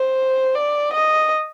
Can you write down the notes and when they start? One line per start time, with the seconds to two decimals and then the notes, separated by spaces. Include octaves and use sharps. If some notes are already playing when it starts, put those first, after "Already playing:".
Already playing: C5
0.55 D5
0.93 D#5